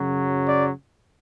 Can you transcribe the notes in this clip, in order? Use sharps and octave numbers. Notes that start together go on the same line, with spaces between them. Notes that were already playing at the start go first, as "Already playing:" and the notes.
Already playing: F#2 C#3 F#3
D5